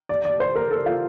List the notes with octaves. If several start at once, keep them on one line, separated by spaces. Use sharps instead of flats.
D5
D5
C5
A#4
A4
F4